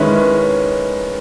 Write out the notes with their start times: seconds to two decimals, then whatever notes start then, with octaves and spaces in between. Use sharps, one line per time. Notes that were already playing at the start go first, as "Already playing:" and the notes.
Already playing: D#3 G#3 C#4 E4 B4